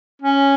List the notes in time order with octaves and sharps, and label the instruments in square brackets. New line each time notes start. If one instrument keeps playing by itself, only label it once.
[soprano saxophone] C#4